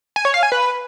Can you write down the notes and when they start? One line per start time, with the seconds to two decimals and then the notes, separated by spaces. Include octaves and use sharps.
0.16 G#5
0.25 C#5
0.34 F5
0.43 G#5
0.52 B4